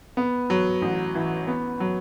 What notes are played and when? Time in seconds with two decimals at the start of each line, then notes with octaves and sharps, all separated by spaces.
0.17 B3
0.50 F#3
0.82 A1
1.15 E3
1.47 B3
1.80 F#3